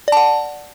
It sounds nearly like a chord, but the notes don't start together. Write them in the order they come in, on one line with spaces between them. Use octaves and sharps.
D5 A5 F#5